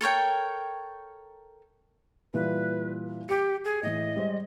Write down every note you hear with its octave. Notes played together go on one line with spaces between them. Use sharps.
A4 A#4 C#5 G5
A#2 E3 G3 B4
G4 D6 C#7
G#4
A2 E3 D#5
G3 G#3 C5